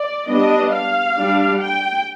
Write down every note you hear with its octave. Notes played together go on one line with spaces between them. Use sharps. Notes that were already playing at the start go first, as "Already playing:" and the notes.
Already playing: D5
G3 B3 D4 D#5
F5
G3 D4
G5